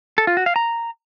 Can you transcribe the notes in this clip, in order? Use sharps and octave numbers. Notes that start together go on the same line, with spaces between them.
A4
F4
F#4
F5
A#5